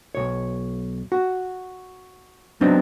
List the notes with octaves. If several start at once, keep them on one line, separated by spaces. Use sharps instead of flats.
B1 C#5
F#4
F#3 B3 C4 D4 D#4